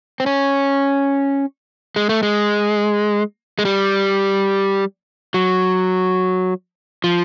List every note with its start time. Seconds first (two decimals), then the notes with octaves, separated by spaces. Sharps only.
0.20 C4
0.26 C#4
1.96 G#3
2.09 A3
2.23 G#3
3.59 G#3
3.65 G3
5.34 F#3
7.04 F3